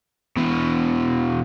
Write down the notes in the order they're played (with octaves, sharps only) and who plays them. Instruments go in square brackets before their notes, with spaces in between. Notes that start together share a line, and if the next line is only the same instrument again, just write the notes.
[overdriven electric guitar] B2 E3